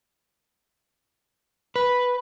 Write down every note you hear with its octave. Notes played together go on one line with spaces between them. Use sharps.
B4